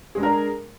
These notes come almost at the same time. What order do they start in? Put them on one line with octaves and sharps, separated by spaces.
G#4 G#3 D4 A#4